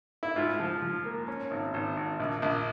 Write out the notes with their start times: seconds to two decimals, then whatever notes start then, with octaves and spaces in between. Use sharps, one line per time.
0.23 E4
0.36 G#2 F4
0.60 F3
0.82 F3
1.05 A#3
1.28 C#4
1.51 G#1
1.74 G#1
1.97 G#1
2.20 A#1
2.42 A#1